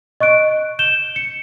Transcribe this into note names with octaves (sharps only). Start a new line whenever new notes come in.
D#5 C#6 F#6 D7
G6 E7 G7
C#7